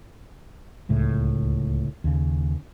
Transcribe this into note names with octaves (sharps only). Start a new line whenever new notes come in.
D1 C#2 A2
D#2 C#3